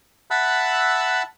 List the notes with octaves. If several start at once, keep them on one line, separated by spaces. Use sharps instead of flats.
E5 F#5 A5 B5 E6 F#6